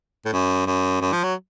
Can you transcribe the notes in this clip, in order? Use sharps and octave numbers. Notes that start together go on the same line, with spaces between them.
A2
F#2
F#2
F#2
F3
F#3